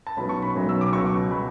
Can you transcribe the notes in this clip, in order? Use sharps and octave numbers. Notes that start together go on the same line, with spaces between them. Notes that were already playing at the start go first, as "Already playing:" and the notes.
A5
B1 B2 F#3 C#4 B5
C#6
B5
B1 B2 F#3 C#4
E6
D6
C#2 B2 F#3 C#6
B2 F#3 B5